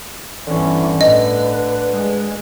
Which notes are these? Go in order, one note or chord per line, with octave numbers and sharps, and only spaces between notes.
G1 D3 E3 C#4
A2 B4 D#5
G#3